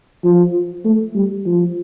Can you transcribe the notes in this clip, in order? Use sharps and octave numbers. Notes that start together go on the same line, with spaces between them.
F3
A3
G3
F3